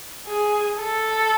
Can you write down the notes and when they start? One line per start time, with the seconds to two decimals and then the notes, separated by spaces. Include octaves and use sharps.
0.26 G#4
0.79 A4